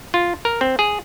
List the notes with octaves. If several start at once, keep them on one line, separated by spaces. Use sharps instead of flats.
F4
A#4
C4
G#4